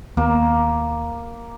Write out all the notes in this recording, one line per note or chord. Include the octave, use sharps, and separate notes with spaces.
D#2 A#3 B3